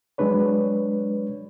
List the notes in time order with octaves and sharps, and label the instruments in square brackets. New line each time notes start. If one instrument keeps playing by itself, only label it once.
[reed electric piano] F#3 G#3 D4 B4 C#5